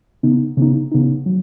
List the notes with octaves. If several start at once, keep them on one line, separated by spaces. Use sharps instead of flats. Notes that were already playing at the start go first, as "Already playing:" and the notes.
C#3 B3 D#4
C#3 B3 D#4
C#3 B3 D#4
F#3